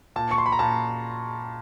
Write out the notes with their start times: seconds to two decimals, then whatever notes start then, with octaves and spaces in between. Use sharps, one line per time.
0.16 A#2 A5
0.31 C#6
0.38 C6
0.46 B5
0.52 A#5
0.59 A#2 A5